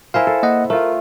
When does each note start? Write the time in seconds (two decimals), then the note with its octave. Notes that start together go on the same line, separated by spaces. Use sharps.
0.14 E4 A#4 C5 F5 G#5
0.27 A4
0.43 A#3 D#5 F#5
0.70 A3 F4 A#4